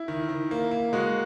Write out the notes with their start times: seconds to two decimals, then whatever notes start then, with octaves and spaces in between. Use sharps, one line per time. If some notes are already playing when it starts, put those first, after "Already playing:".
Already playing: E4
0.08 D#3
0.29 D#3
0.51 A#3
0.71 A#3
0.93 G#3 F#4